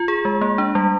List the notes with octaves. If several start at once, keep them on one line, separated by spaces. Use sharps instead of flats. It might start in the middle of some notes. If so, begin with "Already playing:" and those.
Already playing: F4
G#4
G#3
A#3
D4
G3